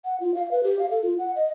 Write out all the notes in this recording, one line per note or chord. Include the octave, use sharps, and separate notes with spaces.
F#5
F4
F5
B4
G4
F5
A4
F4
F#5
D#5